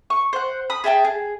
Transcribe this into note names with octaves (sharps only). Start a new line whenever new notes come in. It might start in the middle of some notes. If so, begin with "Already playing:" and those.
C#6
C5 F#5
B5 D#6
G#4 E5 G5 A5
G#4